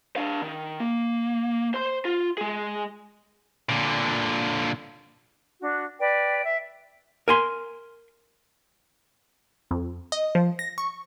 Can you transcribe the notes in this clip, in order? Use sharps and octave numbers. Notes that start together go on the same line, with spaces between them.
D4 F5
D#3
A#3
C5 C6
F4
G#3 G#4
A#2 D3
D4 F#4
B4 D5 G5
E5
A#4 G#5 C6
F2
D#5
F3
A#6
C#6